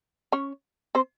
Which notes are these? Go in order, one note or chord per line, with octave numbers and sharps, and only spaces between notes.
C#4 C#5
C4 C5